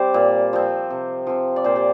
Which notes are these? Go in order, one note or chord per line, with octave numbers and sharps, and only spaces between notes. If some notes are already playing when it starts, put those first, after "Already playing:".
Already playing: G3 C4 G4 C5 D5
A#2
F3 C4
C3
F3 C4
D5
A#2 C5
G4